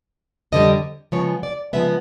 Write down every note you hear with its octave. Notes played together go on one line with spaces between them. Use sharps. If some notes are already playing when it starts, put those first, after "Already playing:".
F2 D3 G3 D#5
C#3 F3 G#3 B3 C#5
D5
C#3 F3 G#3 B3 E5